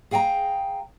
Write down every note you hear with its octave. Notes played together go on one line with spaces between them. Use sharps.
G#4 F5 G5 A5 A#5